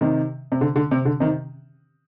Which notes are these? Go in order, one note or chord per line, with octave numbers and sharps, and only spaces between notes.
C3 D#3
C3
D3
D3
C3
D3
C3 D#3